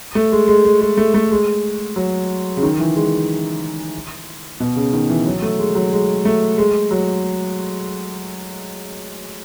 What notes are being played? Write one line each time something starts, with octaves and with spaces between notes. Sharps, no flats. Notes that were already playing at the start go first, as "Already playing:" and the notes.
A3
G#3
G#3
G#3
G#3
A3
A3
G#3
F#3
C#3
D#3
E3
G#3
B2
C#3
D#3
E3
F#3
A3
G#3
F#3
G#3
A3
G#3
F#3